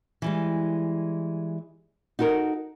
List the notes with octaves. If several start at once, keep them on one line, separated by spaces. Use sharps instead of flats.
E3 G3 G#3
D#4 F#4 A4 A#4